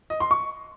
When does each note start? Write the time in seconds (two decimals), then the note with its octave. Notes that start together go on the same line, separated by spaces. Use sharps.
0.10 D#5
0.20 C6
0.31 C#6